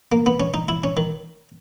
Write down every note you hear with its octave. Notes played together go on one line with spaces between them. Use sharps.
A#3
B3
C#4
D#4
E4
C#4
D#3